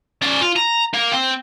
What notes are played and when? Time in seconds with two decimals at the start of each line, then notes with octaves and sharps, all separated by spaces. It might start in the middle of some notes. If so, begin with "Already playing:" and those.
0.22 C#4 D5
0.41 F4
0.56 A#5
0.94 A#3
1.12 C4